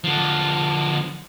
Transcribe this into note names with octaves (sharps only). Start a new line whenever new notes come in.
D3 F3